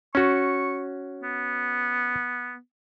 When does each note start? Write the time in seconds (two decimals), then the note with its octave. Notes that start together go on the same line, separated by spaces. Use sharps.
0.15 C#4 F#4 C#6
1.23 B3